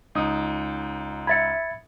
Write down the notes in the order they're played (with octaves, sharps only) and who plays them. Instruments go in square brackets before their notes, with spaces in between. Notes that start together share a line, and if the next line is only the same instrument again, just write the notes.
[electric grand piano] C#2 D#4 D#6
[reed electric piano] E5 B5 [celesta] G#6 A6 C#7